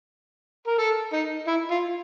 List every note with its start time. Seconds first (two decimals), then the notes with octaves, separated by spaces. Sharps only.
0.67 A#4
0.78 A4
1.12 D#4
1.47 E4
1.70 F4